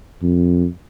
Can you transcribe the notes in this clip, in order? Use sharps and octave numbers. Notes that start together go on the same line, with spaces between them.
F2